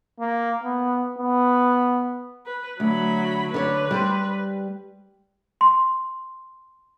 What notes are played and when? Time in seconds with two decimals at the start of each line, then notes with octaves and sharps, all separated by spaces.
0.20 A#3
0.63 B3
1.19 B3
2.46 B4
2.80 D2 F#3 B5
3.54 D3 B4 C#5 D5
3.91 G3 G4 C5
5.61 C6